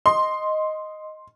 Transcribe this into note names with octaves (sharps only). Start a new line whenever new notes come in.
D#5 C6